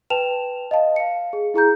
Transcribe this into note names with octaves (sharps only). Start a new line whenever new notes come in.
B4 G5 A5 E7 F7
D#5 F5 A5
F5 C#7
G#4
E4 G#4 A#5 G6